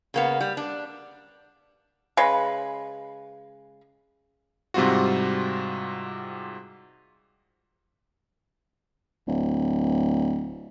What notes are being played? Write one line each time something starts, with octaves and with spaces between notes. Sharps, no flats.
C#3 A#3 B3
G3
D4
C#3 G#3 B4
G#2 C3 G3 C4 F4 F#4
D1